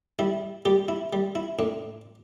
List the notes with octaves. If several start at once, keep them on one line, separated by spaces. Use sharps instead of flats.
G3 E4
G3 G4
E4
G3
E4
A2 D4